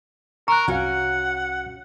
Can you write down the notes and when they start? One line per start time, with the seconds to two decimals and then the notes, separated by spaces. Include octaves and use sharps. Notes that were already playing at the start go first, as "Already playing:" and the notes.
0.48 A#4 A#5 C#6 F#6
0.68 C2 C#4 F#4 F5 F#5